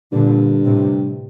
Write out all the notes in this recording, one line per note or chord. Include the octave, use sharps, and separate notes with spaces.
G2 A#2 D3
A2 C3